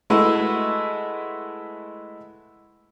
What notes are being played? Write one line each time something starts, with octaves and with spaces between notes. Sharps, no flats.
G#3 A3 E4 F#4 B4